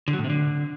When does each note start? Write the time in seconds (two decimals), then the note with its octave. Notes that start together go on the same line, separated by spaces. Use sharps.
0.08 D3
0.13 F#3
0.19 A2
0.24 C3
0.30 D3